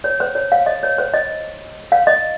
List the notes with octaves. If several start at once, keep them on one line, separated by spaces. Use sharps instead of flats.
C#5
C5
C#5
F5
D#5
C#5
C5
D#5
F5
D#5